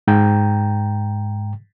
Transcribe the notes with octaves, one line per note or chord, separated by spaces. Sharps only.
G#2 G5 A#5